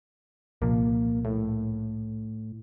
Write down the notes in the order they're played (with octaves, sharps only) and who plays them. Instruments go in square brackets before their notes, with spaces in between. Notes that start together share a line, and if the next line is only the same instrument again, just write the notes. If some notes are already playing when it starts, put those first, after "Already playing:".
[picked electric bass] C2 A#2 F3 [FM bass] A#3
[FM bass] A2